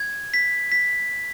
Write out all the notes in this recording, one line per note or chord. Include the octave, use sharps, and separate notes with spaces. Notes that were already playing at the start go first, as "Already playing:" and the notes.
Already playing: G#6
B6
B6